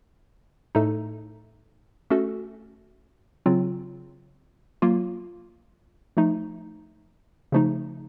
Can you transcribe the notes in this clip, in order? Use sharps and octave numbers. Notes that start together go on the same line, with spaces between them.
A2 A3 D#4 A4
A3 C#4 F#4 A4
C#3 F#3 C4 F4
F#3 A#3 F4
F3 A3 D#4
C#3 F3 A3 D#4